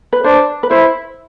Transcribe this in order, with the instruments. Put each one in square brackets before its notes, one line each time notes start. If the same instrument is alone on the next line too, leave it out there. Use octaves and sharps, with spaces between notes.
[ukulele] B4
[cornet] D4 [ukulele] C5
[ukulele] B4
[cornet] E4 [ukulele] C5